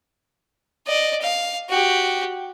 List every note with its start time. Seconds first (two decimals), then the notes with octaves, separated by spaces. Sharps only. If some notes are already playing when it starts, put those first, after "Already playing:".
0.87 D5 D#5
1.21 F5
1.69 F#4 G4